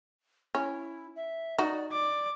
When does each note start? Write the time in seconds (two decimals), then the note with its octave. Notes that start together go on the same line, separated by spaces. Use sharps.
0.55 C#4 E4
1.16 E5
1.58 D#4 F#4 D5
1.92 D5 D6